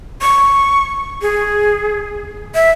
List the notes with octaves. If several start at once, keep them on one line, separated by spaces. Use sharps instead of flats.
C#6
G#4
E5